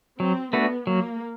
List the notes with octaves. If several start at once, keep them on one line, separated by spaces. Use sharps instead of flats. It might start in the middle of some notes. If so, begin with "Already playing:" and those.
F#3 C4
A3 B3 D4 F#4 B4
F#3 A#3